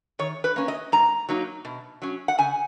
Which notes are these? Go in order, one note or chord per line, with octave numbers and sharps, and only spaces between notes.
D#3 C#5
B4
A#3 C#4
D#5
G#2 A#5
F#3 A#3 D#4
B2
F#3 C#4
F#5
C#3 G#5